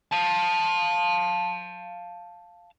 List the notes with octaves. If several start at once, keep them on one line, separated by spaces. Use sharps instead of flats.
F5 A5